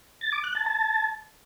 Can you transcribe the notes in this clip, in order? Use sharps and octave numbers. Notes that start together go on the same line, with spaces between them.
A6
D6
F#6
A5
A5